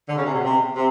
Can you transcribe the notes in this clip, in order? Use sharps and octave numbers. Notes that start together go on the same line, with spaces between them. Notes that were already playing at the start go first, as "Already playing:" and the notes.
D3
C#3
C3
B2
C3
C3